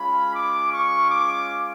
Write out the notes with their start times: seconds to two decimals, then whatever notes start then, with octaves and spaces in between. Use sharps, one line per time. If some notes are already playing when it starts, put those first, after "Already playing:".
Already playing: G#3 C#4 F4 B5
0.35 D6
0.72 C#6
1.10 D6